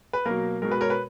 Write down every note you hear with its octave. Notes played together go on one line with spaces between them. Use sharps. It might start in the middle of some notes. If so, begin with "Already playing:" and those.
B4
B2 F#3 A#3 A#4
B2 G#3 A#4
B4
A#4 C#5
B4